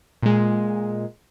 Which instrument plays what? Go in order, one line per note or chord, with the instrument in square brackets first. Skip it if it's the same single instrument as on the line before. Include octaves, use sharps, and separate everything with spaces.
[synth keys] A#2 G#3